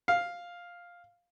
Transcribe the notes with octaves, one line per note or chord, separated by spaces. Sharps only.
F5